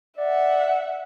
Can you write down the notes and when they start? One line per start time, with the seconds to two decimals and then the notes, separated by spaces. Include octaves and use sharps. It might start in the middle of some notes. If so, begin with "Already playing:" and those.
0.18 D5 E5 F#5